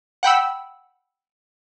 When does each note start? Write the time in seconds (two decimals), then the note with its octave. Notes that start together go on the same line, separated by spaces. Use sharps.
0.23 F#5 G5 B5 E6